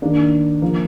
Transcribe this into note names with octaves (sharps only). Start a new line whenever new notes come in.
D#3 A#3 D4
F3 A#3